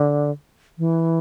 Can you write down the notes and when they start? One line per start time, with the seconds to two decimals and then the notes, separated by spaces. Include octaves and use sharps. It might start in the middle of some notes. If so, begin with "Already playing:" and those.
Already playing: D3
0.78 E3